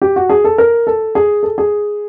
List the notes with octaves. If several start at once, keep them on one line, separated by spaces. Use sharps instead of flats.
G4
F#4
G#4
A4
A#4
A4
G#4
A4
G#4